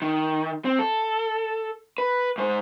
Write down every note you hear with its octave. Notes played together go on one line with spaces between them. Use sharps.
D#3
C4
A4
B4
G#2 C5